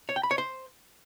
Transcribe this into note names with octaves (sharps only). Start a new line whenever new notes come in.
C#5
G5
B5
C#5
C5